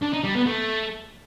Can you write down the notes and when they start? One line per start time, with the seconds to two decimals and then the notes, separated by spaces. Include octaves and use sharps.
0.03 D4
0.14 D#4
0.24 G3
0.35 B3
0.46 A3